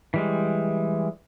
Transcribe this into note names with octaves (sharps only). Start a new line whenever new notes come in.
E3 G3 G#3